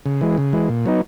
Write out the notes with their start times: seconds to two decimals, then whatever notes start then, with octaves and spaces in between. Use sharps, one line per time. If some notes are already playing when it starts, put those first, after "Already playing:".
0.06 C#3
0.21 E3 G#3
0.38 C#3
0.53 E3 G#3
0.69 A#2
0.86 F#3 B3 D#4